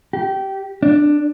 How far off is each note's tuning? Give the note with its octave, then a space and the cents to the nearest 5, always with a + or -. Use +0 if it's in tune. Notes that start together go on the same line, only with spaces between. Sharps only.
G4 -20
D4 +10